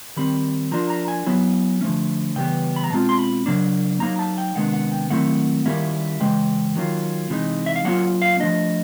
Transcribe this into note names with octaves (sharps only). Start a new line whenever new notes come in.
D#3 G3 C4 B5
F3 A#3 D4 F4 A#5
A#5
G#5
F#3 B3 E4
D3 F3 A3 C#4
C#3 E3 G3 B3 G5
B5
A#5
B2 G#3 C4 F4 A5
C6
B5
C#3 F#3 A#3 D4
F#3 A#3 D#4 A#5
A5
G5
C3 D#3 G#3 B3 D4 F#5
F#5
G5
D#3 F#3 A3 C4 E4 F#5
D#3 G3 A#3 C#4 E4
C#3 E3 G#3 G5
D#3 F#3 A#3 C#4 F4
C3 E3 G#3 B3 D#4
E5
F5
F#3 A#3 C#4 F4 F#5
F5
F3 A3 D4 D#5